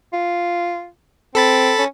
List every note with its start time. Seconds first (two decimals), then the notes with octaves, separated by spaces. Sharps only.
0.13 F4
1.35 C4 A4 B5 A6
1.79 C#4